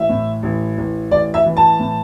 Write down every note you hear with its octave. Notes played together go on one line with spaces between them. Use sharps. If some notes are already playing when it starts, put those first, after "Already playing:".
Already playing: A1 E5
A2
A1
A1
A1 D5
E5
E3
A5
A2